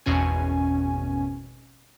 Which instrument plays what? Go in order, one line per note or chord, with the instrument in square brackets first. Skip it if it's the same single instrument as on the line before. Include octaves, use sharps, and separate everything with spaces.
[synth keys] G#1 E2 B2 C#4 G#5